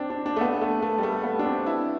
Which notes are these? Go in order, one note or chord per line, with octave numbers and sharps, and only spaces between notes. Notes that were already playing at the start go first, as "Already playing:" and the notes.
Already playing: C4 D4
D4
D4
A3
B3
A3
A3
G3
A3
B3
D4
C4
E4